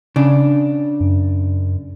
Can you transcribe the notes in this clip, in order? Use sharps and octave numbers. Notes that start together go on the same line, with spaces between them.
C#3 D4
F#2